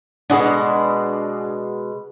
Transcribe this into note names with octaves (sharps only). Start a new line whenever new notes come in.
B2 G#3 D4 G#4 F#5